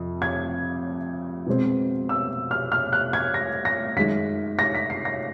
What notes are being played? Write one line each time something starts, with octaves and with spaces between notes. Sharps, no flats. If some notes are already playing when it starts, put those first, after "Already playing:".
Already playing: F2 C3
G#6
B2 G#3 C4
E6
F6
F6
F#6
G#6
A#6
A#6
F#2 D#3 G#3 B6
A#6
B6
C7
A#6